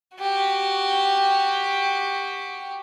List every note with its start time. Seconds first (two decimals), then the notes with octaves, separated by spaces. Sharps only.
0.17 F#4 G4